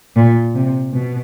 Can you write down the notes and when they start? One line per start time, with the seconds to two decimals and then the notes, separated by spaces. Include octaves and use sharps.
0.16 A#2
0.55 C3
0.93 B2